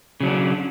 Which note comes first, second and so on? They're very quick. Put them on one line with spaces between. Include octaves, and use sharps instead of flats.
C#3 F#3 D4 C#4